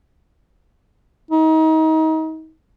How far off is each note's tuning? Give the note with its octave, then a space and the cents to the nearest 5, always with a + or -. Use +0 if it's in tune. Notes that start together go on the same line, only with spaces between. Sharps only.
D#4 +30